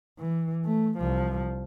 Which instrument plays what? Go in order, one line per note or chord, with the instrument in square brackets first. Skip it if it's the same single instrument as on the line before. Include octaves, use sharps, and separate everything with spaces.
[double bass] E3
A3
C2 F3